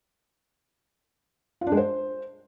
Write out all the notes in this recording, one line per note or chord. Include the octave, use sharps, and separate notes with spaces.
F4
D4
G#3
C5